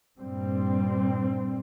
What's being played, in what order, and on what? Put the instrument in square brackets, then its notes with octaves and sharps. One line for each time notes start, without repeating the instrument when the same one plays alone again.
[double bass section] G2 A#2 G3 C4